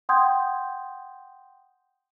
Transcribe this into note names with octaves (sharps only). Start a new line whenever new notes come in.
F#5 G5 C6 D#6 G6 G#6